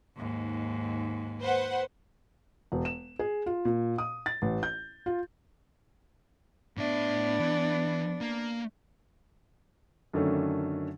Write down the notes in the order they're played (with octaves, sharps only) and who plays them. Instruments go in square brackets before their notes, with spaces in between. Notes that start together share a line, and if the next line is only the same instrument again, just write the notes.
[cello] D#2 G#2
[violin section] B4 C5 F#5
[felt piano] E1
E7
G#4
F4
A#2
D#6
A6
A1
G6
F4
[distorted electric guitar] A2 E5 [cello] B3 D4
[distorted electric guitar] E3
A#3
[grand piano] F#2 D3 D#3 A3 C#4 D4